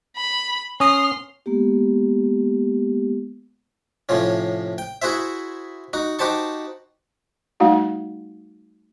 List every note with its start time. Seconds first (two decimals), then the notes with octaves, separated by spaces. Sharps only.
0.16 B5
0.80 C#4 C6 D#6 F6
1.46 G#3 A#3 B3 G4
4.09 A2 C3 F3 C#4
4.78 G5
5.02 E4 F#4 G#4 C5 E5
5.93 D#4 F#4
6.19 D#4 F#4 G4 C5 A5 C#6
7.60 G3 A3 D#4 F#4 F5 F#5